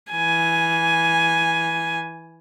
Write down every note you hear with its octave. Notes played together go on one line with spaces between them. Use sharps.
E3 G#5